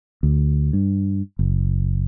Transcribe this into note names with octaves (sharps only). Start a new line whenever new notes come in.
D2
G2
F#1